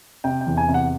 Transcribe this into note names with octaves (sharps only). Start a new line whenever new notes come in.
C3 G5
G5
E2
G#5
C3
F#5